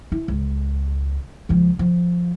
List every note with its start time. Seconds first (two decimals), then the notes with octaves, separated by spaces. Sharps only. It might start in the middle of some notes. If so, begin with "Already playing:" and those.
0.12 E4
0.28 C#2
1.49 C#2 F3
1.79 F3